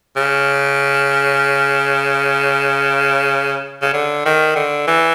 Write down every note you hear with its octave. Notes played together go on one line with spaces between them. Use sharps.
C#3
C#3
D3
D#3
D3
E3